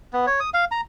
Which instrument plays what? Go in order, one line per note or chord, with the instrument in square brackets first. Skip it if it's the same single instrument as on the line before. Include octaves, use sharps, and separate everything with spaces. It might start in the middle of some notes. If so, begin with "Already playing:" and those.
[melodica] B3
C#5
D#6
F5
A#5